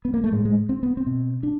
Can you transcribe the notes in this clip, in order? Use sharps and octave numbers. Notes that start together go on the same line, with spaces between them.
B3
A#3
A3
A2 G#3
G#3
C4
B3
C4
B2
D4